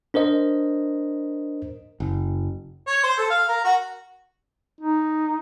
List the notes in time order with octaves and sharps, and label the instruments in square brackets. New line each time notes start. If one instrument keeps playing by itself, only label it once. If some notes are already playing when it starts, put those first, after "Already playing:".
[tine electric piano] D4 A#4 C5 D#5
[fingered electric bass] F#1
[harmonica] C#5
C5
A4
F5
A#4
F#4
[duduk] D#4